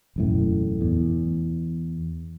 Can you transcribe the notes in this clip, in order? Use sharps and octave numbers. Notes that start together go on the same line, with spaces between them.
E1 F#2 A2
E2